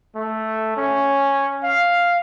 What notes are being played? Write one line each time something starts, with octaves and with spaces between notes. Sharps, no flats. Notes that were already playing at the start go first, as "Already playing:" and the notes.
A3
C#4
F5